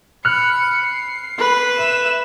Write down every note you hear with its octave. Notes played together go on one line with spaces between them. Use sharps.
B5 F6 F#6 C#7
C7
B4
E5 E7